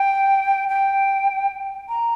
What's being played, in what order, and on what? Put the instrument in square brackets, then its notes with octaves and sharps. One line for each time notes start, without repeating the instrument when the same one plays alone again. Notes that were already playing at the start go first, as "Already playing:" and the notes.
Already playing: [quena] G5
G5
A#5